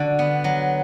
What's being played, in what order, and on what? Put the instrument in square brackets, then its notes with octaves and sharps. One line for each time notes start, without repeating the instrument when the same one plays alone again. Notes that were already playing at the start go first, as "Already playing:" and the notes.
Already playing: [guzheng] D3 F#4 D5
B3
F#3